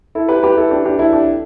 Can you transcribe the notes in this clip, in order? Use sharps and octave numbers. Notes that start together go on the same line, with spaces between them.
E4 A4
G4 B4
G4 B4
E4 A4
D4 G4
D4 G4
E4 A4
D4 G4